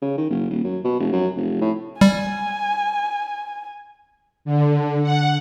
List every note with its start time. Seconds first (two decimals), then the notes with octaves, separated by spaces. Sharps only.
0.02 C#3
0.18 D#3
0.30 F#1
0.50 D#1
0.64 F#2
0.84 B2
1.00 F1
1.12 F#2
1.37 F1
1.61 A2
2.01 G3 G#5
4.45 D3
5.03 F#5